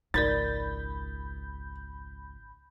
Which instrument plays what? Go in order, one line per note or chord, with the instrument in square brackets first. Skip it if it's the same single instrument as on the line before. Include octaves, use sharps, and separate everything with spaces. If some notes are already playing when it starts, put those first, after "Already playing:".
[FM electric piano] G#1 B5 G6 [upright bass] C#2 [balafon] D#4 A#4 D5 [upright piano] A6